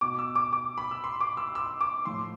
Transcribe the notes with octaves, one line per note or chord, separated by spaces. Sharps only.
B2 D6
E6
D6
D6
B5
E6
C6
D6
E6
E6
D6
A2 F3 C6